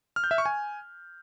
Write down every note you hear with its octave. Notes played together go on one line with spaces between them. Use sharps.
F6
G6
E5
C#6
G#5